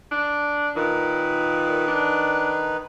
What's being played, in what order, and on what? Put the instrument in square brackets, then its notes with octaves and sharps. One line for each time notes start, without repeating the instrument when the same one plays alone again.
[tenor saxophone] D4
[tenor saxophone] A#2 [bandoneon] D#3 D#4 B4
[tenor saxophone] D4